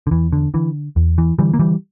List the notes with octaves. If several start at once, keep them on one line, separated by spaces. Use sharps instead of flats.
D3
E2 E3
D3
D3 E3
E2
E3
D3 E3 G3
A#3
E3 G3